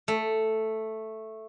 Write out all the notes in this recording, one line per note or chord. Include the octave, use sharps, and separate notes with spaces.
A3